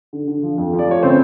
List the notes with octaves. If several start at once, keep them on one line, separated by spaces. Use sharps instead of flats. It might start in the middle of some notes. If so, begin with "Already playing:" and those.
D3
D3
F3
F2
F3
D5
A3 C#5
C#3 C4 C5